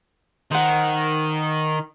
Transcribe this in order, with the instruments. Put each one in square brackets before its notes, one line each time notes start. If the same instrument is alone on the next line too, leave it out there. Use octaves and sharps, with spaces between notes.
[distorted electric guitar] D#3 [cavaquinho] C5 F#5